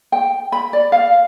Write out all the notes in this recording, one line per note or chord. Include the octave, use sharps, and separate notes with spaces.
G5
B5
D5
F5